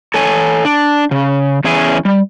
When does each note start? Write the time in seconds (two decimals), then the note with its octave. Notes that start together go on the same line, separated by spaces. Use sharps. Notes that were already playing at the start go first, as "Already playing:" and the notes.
0.14 A4 C#5 G#5
0.65 D4
1.11 C#3
1.64 E2 C#4 E4 G#4 G#5
2.05 G3